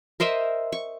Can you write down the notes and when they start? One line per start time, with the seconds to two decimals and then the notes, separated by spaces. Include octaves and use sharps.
0.20 A#4 C5 D#5 E5
0.72 C#6